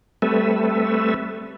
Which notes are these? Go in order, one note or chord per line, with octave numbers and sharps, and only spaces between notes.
G3 A3 C4 A4 B4 E5